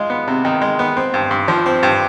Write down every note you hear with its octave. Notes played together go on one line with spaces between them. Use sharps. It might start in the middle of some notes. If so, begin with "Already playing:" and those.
Already playing: G#3 F4
B3
C3
D#3
G#3
B3
C4
G2
G2
F3
C4
G2